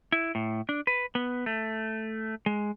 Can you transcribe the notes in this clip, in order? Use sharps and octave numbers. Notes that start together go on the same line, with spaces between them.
E4
A2
D4
B4
B3
A3
G#3